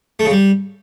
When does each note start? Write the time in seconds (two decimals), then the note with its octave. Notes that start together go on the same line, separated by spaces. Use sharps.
0.19 A3
0.25 C#3
0.31 G3